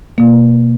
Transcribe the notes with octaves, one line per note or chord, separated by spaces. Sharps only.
B2 A#3